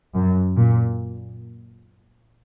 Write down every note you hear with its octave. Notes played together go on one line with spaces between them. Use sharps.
F#2
A#2